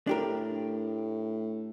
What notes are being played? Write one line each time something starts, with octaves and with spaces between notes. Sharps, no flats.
A2 D4 G4 A#4